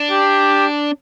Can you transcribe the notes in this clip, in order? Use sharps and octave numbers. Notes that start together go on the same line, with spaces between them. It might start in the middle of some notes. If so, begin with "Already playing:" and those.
Already playing: D4
G4